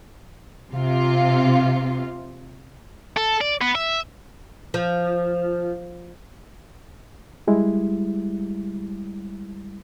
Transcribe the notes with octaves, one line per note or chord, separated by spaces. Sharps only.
C3 F4
A4
D5
B3
E5
F3
G3 G#3 E4